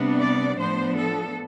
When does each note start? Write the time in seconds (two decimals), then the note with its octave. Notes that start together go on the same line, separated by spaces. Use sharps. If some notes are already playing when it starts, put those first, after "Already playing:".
Already playing: C3 G3 B3 D4
0.19 D5
0.58 A2 F3 B3 D4 C5
0.97 A4